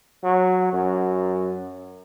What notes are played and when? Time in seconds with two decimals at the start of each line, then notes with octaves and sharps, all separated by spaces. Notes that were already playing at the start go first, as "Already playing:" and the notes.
0.23 F#3
0.73 F#2